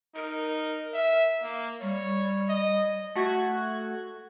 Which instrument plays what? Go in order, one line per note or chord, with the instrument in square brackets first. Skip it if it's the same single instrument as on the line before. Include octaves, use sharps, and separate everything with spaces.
[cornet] D#4 [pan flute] A#4
[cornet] E5
A#3
[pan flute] G3 [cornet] C#5
[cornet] D#5
[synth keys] A3 F#4 F#6 G#6